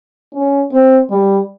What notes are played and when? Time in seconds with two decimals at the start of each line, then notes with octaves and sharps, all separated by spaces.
0.34 C#4
0.72 C4
1.10 G3